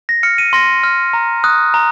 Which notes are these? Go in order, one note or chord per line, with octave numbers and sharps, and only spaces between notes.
A#6
F6 C#7
D#7
C6 A#6
F6
A#5
D#6 F#6
A#5